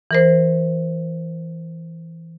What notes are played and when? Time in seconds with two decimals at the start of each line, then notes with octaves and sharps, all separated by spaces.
0.11 E3 A#4 C5